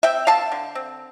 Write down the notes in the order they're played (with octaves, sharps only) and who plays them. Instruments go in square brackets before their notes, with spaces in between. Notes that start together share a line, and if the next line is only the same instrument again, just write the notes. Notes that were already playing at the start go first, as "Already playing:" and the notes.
[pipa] C4 E5 G5
D3 F5 A5
D3
C4